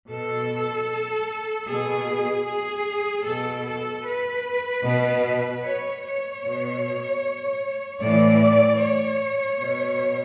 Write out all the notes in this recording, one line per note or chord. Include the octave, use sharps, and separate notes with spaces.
B2 A4
B2 G#4
G#4
B2 A4
A4
B4
B2
C#5
C#5
B2
A2 E3 D5
C#5
B2